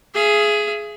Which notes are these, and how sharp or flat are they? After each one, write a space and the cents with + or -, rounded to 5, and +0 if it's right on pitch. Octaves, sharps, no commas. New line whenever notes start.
G#4 +10 E5 +45